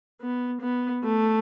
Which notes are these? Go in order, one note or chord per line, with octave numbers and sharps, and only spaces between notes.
B3
B3
A3